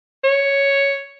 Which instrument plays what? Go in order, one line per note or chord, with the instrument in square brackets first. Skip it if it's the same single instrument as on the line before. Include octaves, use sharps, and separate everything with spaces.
[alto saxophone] C#5